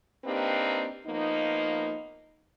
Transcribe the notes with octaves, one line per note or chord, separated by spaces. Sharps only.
A#3 C4 D4 D#4 G4 B4
F3 A#3 B3 D#4